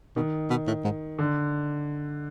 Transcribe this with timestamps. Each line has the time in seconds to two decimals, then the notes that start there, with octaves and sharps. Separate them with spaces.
0.16 B2 D#3
0.50 B2
0.67 A2
0.84 G#2
1.19 D3